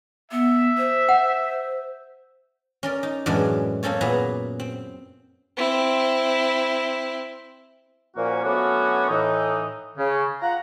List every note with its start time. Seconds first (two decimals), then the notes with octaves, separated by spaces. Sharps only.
0.32 B3 E5
0.78 C5
1.09 F#5
2.83 C#4 A#4 D5
3.03 D#4
3.26 F#2 A2 E3 G#3 C#4 D4
3.83 A#3 C4 C#4 A4 C#5
4.01 A#2 B3 E4 G#4 B4 A#5
4.60 C4
5.57 C4 E4
8.16 A#2 F3 A#3 C#4 F#4
8.43 F#3 A3 B3 C#4 D4 F#4
9.09 A2 E3 D#4
9.98 C#3
10.41 F4 F#5 A#5